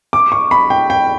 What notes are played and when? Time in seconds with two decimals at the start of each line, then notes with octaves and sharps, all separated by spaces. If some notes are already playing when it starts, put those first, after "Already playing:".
0.13 D6
0.32 C#6
0.51 B5
0.70 G5
0.90 G5